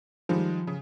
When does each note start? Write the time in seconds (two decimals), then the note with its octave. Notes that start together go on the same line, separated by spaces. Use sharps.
0.29 D#3 F3 G3 G#3
0.67 C#3